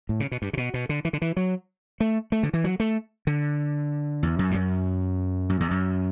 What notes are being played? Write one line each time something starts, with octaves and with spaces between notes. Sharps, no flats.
A2
C#3
B2
G2
C#3
B2
B2
D3
E3
D3
E3
F#3
A3
A3
D3
E3
F#3
A3
D3
E2
F#2
G2
F#2
F#2
E2
F#2